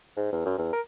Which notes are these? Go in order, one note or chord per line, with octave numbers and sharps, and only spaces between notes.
G#2
E2
F#2
E2
A#4